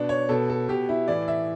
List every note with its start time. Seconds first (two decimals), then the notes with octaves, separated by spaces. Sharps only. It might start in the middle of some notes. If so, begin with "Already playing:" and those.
Already playing: B2 D4
0.09 C#5
0.29 B2 A4
0.50 A4
0.69 B2 G4
0.89 E4
1.08 A2 E3 D5
1.28 E5